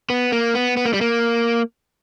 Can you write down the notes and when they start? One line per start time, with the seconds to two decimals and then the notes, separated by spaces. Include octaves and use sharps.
0.10 B3
0.32 A#3
0.55 B3
0.77 B3
0.86 A#3
0.93 G3
1.01 A#3